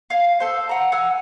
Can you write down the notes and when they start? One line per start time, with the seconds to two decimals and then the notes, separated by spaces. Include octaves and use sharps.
0.10 F5 G#5
0.40 A4 C5
0.69 F#5 A#5
0.92 F#5 G#5 E6